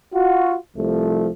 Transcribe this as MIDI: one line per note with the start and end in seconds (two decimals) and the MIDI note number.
0.14 0.55 65
0.14 0.55 66
0.76 1.28 36
0.76 1.28 53
0.76 1.28 57